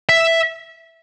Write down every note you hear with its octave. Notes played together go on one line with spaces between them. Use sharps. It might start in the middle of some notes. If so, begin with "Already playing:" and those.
E5